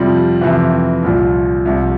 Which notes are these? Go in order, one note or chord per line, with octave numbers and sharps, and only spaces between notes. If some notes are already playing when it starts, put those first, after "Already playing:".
Already playing: F2 C3 F3 G3
F2 C3 E3
C2 A#2 F3
C2 C3 F3